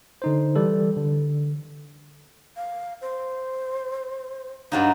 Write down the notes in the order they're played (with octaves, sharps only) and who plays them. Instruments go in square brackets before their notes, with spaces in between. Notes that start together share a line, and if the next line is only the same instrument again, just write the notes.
[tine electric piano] D3 D#4 C5
E3 G3 A4
D3
[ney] F5
C5
[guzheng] G2 F#3 D#4 [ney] F5